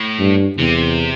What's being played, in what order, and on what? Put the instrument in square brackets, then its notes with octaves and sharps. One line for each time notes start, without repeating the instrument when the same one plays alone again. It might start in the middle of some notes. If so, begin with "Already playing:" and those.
Already playing: [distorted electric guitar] A2
[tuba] G2
[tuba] E2 [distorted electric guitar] C3